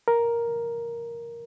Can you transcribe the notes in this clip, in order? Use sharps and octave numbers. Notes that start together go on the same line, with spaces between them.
A#4